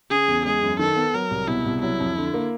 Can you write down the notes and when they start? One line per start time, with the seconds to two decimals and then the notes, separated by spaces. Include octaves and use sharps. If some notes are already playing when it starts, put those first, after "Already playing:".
0.10 C#3 G#4
0.28 E2
0.45 G#3 G#4
0.62 F#2
0.79 D#3 A4
0.96 B3
1.14 F#3 A#4
1.31 C2
1.47 B2 E4
1.65 C2
1.82 F#3 E4
2.00 F2
2.17 D3
2.34 A#3